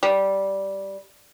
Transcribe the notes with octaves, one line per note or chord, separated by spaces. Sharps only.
G3